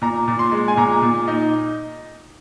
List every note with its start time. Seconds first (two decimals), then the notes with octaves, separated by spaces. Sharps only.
0.02 A#2 A#5
0.28 A#2
0.39 C6
0.52 G#3
0.68 G#5
0.77 A#2 A#5
1.02 A#2
1.28 D#4